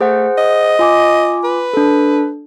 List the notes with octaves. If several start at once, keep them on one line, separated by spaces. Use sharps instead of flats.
A3 G#4 C5 F#5
D#5
F4 G#5 D6
B4
D4 A4